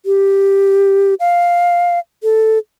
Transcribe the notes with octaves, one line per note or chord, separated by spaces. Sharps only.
G4
F5
A4